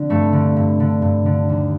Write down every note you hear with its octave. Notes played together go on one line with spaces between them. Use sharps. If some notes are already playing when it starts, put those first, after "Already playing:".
Already playing: D3 C4 D4
G2 A3
D3
G2
D3
G2
D3
D#2